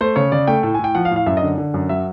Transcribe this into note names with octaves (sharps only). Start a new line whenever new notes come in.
A3 C5
C#3 C#5
C#3 D5
A3 G5
A2 G5
G#5
A2 G5
F3 F#5
F5
A2
F5
F#2 E5
D#5
D3
D3
F#2
F#3 E5